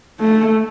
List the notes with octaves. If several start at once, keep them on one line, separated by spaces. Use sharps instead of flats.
A3